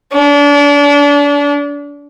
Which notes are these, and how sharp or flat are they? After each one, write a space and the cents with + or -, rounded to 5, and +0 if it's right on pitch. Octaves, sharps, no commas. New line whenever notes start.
D4 -35